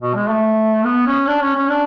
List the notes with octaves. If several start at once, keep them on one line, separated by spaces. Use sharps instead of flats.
B2
G#3
A3
B3
C#4
D4
C#4
C#4
D4